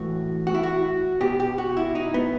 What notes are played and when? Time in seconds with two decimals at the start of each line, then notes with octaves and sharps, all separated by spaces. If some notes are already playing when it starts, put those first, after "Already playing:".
Already playing: A2 E3 F#4
0.47 F#4
0.55 E4
0.63 F#4
1.21 B2 G4
1.40 G4
1.58 F#4
1.77 E4
1.95 D#4
2.14 B3